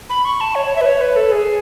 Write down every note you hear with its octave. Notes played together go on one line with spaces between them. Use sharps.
B5
C#6
A5
C#5
C#5
E5
B4
C#5
B4
A4
G#4